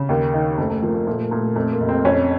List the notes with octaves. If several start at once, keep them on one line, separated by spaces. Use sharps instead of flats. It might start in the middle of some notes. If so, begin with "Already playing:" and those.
Already playing: C#3
D#2 A#3
D#3
F#1 A3
A3
F3 A#3
A#3
A#2 A3
A#3
A#2 A3
A#3
F2 A3
A#3
F1
C4
F2 C#4